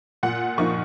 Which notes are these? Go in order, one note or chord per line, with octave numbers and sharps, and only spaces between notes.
A#2 F#5
F3 A#3 D#4 C#6